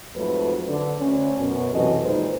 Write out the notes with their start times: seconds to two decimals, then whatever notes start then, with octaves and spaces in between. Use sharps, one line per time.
0.15 F2 G#2 F#3 A3 B4
0.66 D3 D4
1.00 D2 C#4
1.39 F#2 B2
1.74 F#2 C3 E3 F#4 A4 D#5
2.04 A#2 D#3 G#3 D#4 B4 C5